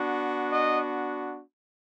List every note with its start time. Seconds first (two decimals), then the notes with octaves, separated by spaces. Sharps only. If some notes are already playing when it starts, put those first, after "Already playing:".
Already playing: B3 D4 F#4
0.50 D#5